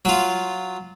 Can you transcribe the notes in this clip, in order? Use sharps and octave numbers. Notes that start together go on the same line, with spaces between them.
F#3 F4